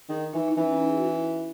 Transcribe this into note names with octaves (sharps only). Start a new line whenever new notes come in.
D#3 G#4
E3 D#4
D#4
E3 C#4
C#4
D#4
G#4
F#4
E4